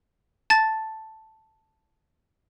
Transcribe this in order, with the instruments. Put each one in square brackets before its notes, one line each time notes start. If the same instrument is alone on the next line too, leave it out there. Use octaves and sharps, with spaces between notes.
[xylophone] A5 A6